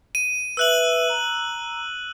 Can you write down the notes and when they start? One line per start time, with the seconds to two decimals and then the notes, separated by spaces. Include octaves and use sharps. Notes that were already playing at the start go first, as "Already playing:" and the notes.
0.15 D#7
0.57 B4 E5 E6 F#6 F#7
1.09 A#5